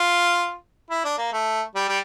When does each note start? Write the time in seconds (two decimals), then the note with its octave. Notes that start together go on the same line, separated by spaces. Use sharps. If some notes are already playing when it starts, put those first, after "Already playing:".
Already playing: F4
0.90 E4
1.05 D4
1.18 A#3
1.32 A3
1.75 G3
1.89 G3